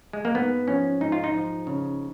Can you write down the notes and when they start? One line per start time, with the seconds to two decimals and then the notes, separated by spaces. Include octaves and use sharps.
0.13 G#3
0.25 A#3
0.34 G#2 B3
0.68 F3 C#4
1.01 G#2 D#4
1.12 F4
1.24 D#4
1.34 F3
1.67 C#3